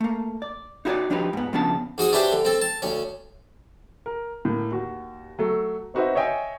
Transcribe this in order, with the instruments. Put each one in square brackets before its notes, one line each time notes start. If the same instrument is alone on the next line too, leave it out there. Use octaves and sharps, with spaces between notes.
[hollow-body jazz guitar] A3 A#3
D5
D#4 E4 F#4 A4 C#5 D5
F3 D4 D#4 G4 B4
G#2 B3
C#3 F3 B3 D4 A5
[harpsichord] G#2 F#4 G#5 D#6
C#4 D4 E4 G4 B4 C5
D3
C4 A4
A5
D2 C#4
[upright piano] A#4
A2 A#3
D#2 F#4
F#3 A3 A4
C4 D#4 F#4 B4 C5 E5
C#5 D#5 E5 G5 G#5